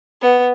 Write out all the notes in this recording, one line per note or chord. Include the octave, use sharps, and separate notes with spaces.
B3